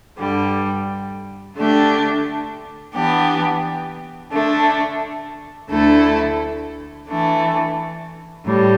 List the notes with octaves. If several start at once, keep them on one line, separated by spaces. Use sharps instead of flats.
G2 D3 G3
D3 A3 D4 G4
E3 B3 D4 G4
D3 A3 D4
D2 D3 A3 E4 A4
E3 A3 D4
A2 G3